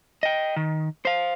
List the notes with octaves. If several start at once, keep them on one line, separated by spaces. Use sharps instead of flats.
D#5 G5
D#3
C5 F5